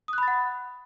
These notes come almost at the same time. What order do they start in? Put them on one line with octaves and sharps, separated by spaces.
D#6 F#6 B5 A6 F#5